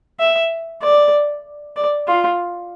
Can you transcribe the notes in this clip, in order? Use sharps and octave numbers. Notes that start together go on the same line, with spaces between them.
E5
D5
D5
F4